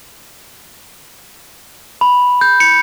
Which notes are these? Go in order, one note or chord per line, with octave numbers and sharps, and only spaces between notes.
B5
G6
C#7